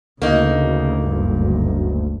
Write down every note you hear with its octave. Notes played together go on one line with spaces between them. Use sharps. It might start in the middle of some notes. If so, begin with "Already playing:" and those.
D2 C#3 A#3 D#4
F#1 G2